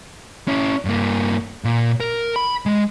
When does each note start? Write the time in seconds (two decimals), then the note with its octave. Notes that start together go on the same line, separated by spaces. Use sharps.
0.48 C#4 E4
0.85 G2 A#3
1.64 A#2
2.00 A#4
2.36 B5
2.66 G#3